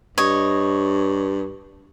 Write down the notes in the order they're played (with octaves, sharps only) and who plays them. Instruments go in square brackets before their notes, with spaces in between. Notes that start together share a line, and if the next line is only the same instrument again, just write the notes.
[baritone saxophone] G2 [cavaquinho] C#5 D#5